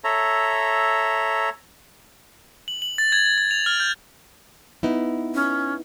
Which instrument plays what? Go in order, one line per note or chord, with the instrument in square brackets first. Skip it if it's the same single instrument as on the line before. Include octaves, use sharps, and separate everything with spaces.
[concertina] A4 C#5 E5 A#5
[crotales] F#7
F#7
A6
G#6
G#6
A6
F7
F6
G6
[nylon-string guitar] B3 D#4 E4
[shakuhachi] C#4